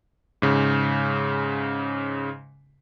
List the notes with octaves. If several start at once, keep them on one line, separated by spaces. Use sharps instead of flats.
G#2 C#3